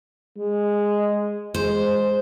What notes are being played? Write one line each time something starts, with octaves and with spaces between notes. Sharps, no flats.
G#3
G#3 C5